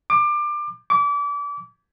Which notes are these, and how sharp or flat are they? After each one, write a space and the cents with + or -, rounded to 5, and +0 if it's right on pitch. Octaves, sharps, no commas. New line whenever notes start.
D6 +25
D6 -30